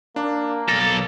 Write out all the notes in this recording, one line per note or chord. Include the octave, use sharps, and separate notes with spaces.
A#3 D4
B1 A4 A#6